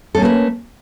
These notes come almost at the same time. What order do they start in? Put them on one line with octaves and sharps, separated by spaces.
A4 C#4 A#3 A3 B4